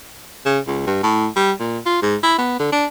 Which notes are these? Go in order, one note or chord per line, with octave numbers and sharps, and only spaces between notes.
C#3
C#2
G2
A2
G3
A#2
F4
G#2
E4
B3
D3
D4